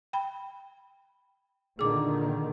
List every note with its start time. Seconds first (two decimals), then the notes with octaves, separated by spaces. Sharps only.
0.13 G5 B5
1.79 A#2 D3 D#3 G#4 D6